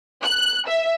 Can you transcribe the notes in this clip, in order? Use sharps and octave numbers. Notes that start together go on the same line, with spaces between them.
F#6
E5